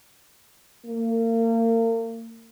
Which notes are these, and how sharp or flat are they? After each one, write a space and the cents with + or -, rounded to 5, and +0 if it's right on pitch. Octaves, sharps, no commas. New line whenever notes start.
A#3 -35